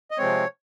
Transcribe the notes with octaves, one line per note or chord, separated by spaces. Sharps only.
D#5
C3 F3 G#3 C4 C#5